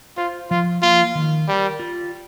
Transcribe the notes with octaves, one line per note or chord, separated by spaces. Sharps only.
F4 C5
F3 F4
A#3 F4
D#3
G3 A#4
F4